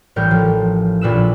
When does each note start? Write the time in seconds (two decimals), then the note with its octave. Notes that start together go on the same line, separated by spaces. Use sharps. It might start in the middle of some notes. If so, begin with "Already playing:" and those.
0.16 A1 A2 G3 A#4 C#5 G6
0.31 F3
1.01 A#1 A#2 A#3 B4 E6 E7